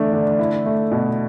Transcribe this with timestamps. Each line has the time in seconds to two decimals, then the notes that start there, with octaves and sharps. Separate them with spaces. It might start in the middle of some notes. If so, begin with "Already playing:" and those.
Already playing: E2 D3 A3 D4
0.13 D3
0.39 E4
0.66 A3
0.92 B2